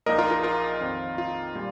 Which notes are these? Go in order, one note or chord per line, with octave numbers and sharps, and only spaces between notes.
A#1 A#2 A#3 D#4 A#4 D#5
F4 A#4
F4 A#4
F4 A#4
F2 D#3 C4 D#4
F4
A#2 G3